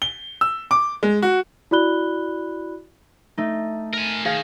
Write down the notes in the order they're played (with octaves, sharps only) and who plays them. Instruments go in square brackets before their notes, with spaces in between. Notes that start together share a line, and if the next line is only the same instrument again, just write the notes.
[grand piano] G7
E6
D6
G#3
F#4
[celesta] E4 F#4 D5 B5 F#6 G7
[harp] A3 D#4
[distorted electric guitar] A#4 G#5
[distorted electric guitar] D#3 [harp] G#4 F5